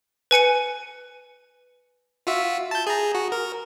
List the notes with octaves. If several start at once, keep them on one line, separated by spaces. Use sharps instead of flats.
B4 G#5 C#7 D#7
F4 F#4 E5
A5 G6
G#4 A#5
F#4
A#4